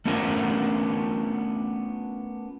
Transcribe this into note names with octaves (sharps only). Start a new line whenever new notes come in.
A3 B3 C#4 D4 F4 A#4